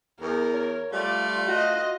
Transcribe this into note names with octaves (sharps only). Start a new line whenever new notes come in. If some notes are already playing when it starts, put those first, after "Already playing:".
E2 A#4
C#5
G3 A3 F4 D5
F4 F#4 D#5